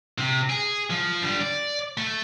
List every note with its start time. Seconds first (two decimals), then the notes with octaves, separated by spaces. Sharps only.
0.18 C3
0.50 G#4
0.90 F3
1.22 D3 G3
1.41 D5
1.98 A3